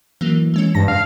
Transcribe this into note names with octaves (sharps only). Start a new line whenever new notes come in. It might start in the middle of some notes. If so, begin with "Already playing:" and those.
E3 F#3 A#3
E3 G#3 C#4
G2 A5 A#6
F5